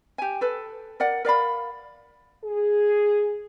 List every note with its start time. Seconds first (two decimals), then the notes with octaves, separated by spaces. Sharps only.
0.18 G4 G#5
0.41 A4 B4
1.00 A#4 D5 F#5
1.25 A#4 D5 F5 B5
2.45 G#4